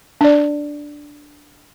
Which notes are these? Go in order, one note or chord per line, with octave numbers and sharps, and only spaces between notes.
D4 D5